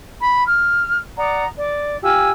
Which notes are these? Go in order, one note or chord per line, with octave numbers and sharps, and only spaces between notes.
B5
F6
D5 F#5 A#5 D#6
D5
F4 G4 G#5 E6